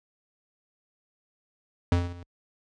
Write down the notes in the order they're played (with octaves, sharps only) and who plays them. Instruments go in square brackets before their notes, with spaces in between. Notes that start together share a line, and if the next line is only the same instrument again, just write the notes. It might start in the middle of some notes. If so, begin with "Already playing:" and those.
[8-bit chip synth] F2